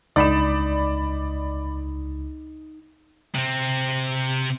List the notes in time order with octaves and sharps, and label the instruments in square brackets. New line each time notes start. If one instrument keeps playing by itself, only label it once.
[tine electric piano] C#2 [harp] D#4 [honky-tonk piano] D5 B5 E7
[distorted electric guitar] C3 C4